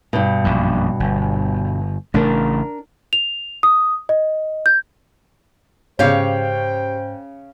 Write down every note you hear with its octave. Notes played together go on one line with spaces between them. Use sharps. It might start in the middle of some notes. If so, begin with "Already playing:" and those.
G2 B2
A#1 F#2
G1
A1 C#3 A3 D4 A#4
F7
D#6
D#5
G6
G#2 C#3 C#4 G4 C5 C#5 F5 G5